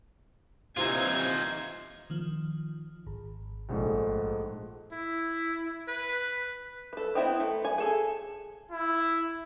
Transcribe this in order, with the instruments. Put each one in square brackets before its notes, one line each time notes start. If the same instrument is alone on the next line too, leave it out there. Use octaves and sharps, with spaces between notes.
[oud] C3 E3 A#3 [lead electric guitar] D#4 F4 [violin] G#6
[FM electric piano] D#3 F3
G#1
[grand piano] A#1 G#2 A3
[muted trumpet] E4
B4
[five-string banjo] A4 B4
B3 C4 D#4 E4
A3
G#5
G#4 A4
[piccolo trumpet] E4